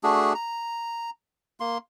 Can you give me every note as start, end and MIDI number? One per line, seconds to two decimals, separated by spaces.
0.03 0.33 57
0.03 0.33 62
0.03 0.33 66
0.03 0.33 68
0.35 1.10 82
1.60 1.78 58
1.60 1.78 84